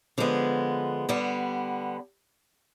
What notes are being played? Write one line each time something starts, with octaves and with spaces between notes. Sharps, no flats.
D3 F3 G#3 B3
D3 G3 B3